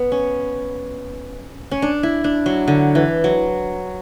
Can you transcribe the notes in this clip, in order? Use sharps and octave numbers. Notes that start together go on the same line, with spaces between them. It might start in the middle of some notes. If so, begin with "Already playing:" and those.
Already playing: B3
C#4
C#4
D4
E4
D4
F#3
D3
E3
F#3